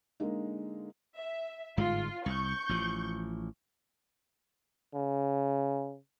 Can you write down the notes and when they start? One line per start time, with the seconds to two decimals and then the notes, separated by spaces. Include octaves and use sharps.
0.20 D3 G#3 A#3 D#4
1.16 E5
1.77 G1 G#2 G#3 F4
2.26 C2 C#6 G6
2.69 A1 F3
4.94 C#3